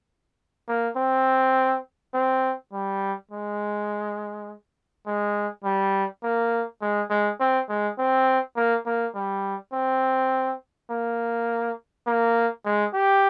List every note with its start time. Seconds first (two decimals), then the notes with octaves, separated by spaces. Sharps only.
0.68 A#3
0.97 C4
2.14 C4
2.73 G3
3.31 G#3
5.07 G#3
5.64 G3
6.23 A#3
6.82 G#3
7.10 G#3
7.40 C4
7.69 G#3
7.99 C4
8.56 A#3
8.86 A#3
9.15 G3
9.73 C4
10.90 A#3
12.07 A#3
12.65 G#3
12.94 G4